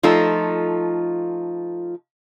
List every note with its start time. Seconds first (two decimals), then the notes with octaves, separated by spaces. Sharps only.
0.03 F3 A3 D#4 F4 A4